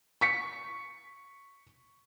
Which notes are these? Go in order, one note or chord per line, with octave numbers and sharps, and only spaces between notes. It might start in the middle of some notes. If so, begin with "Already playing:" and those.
C#6 B6 C#7